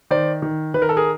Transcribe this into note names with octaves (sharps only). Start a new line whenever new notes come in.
D#3 C5 D5
D#3
D#3 B4
A#4
A4
G#4 A#4